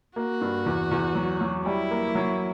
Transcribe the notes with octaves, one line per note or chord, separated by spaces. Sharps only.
A#3 F#4
G2
E2
E2
F#3
F#3
G3 E4
A#3
F#3